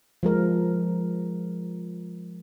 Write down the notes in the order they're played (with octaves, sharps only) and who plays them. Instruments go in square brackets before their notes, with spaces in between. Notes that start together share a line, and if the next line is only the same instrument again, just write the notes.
[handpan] F3 G#3 A#4